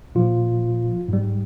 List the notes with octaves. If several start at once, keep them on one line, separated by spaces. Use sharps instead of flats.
A#2 F3 F4
G#2 G3